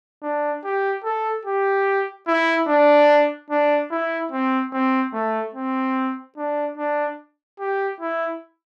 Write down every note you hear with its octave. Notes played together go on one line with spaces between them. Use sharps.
D4
G4
A4
G4
E4
D4
D4
E4
C4
C4
A3
C4
D4
D4
G4
E4